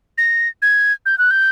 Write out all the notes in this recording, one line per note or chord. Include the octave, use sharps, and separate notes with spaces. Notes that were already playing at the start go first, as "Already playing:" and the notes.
A#6
G#6
G6
F#6
G6